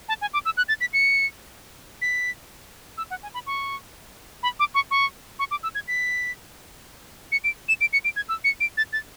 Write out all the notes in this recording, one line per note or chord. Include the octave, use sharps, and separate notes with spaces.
A5
G#5
D6
E6
F#6
A6
B6
C#7
B6
E6
F#5
G#5
B5
C#6
B5
D6
C#6
C#6
C#6
D6
E6
G#6
B6
C#7
D7
E7
D7
C#7
D7
G#6
E6
C#7
D7
A6
A6